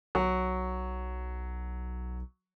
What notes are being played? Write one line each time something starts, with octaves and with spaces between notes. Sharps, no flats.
B1 F#3